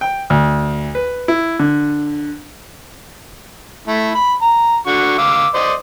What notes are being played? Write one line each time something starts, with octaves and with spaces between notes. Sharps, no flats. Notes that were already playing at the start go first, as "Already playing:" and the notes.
G5
D2
B4
E4
D3
A3 E4
B5
A#5
D3 F#4 C#6
F5 D6 E6
C5 D5 D#5